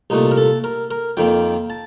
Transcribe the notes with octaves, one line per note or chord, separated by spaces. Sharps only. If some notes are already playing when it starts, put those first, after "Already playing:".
C2 A#2 A3 D#4
A#4
A4
A#4
A#4
F2 D#3 A#3 G5
A5